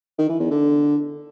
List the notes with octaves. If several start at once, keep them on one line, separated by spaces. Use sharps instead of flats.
D#3
E3
E2
D3